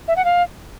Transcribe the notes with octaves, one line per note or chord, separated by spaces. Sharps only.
E5
F#5
F5